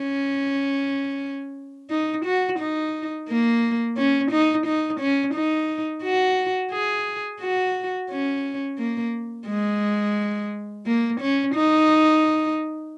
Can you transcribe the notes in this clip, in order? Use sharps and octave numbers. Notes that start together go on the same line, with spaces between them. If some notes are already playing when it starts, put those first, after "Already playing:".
Already playing: C#4
D#4
F#4
D#4
A#3
C#4
D#4
D#4
C#4
D#4
F#4
G#4
F#4
C#4
A#3
G#3
A#3
C#4
D#4